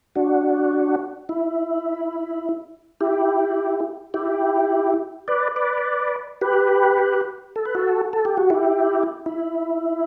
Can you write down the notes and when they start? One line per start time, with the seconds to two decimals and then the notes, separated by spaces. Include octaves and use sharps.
0.15 D4 F#4
1.29 E4
3.01 E4 G4
4.14 E4 G4
5.28 B4 D5
5.56 B4 D5
6.41 G4 B4
7.56 A4
7.65 B4
7.75 F#4 A4
8.13 A4
8.25 G4
8.37 F#4
8.50 E4 G4
9.26 E4